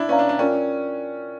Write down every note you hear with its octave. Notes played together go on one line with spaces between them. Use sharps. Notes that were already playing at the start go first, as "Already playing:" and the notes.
Already playing: D4 E4
C#4 B4 D5 F5 A#5
D4
D4
C#4 F4 A#4 D5 G5